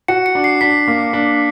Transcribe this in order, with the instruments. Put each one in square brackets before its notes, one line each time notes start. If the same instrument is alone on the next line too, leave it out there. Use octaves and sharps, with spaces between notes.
[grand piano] F#4 [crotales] C#7
[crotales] C#7
[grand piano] D4
[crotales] C7
[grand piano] D4 [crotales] B6
[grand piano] A#3
D4